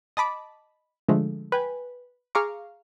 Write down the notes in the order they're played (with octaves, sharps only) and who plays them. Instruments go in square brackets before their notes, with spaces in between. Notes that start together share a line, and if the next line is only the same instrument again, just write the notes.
[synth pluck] D#5 A5 B5 D6
D3 F3 G#3 A3
B4 G5 G#5
G#4 F5 A#5 C#6 D6